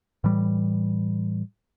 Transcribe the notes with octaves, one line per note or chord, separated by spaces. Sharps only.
A2 E3 G3